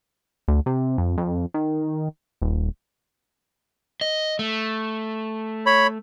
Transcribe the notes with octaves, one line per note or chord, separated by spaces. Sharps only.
D2
C3
F2
F2
D#3
D#1
D#5
A3
C#5 B5